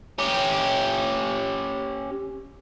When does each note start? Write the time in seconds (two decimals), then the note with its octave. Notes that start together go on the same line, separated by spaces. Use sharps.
0.18 C#4 G4